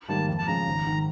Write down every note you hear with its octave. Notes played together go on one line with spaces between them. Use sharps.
G#2 D#3 G3 A#3 A5
F2
A5
C#3 F3 G#3 A#5
G#1
G#2 D#3